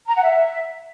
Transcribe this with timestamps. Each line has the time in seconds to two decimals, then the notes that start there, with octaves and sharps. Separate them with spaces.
0.07 A#5
0.15 F#5
0.23 E5